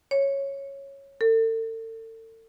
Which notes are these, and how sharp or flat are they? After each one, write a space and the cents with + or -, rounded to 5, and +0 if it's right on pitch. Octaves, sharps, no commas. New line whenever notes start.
C#5 -10
A4 +40